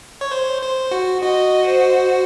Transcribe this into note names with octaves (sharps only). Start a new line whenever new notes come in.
C#5
C5
C5
F#4
F#4 D#5
C5